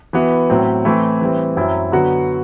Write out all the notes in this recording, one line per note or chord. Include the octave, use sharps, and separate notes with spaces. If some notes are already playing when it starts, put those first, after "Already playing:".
E3 B3 F#4
A2 F#3 C4
E3 A3 C4 E4
E3 G3 C4
F#2 F#3 C4 E4
D3 F#3 B3 F#4